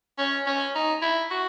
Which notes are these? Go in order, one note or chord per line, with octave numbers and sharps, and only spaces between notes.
C#4
C#4
D#4
E4
F#4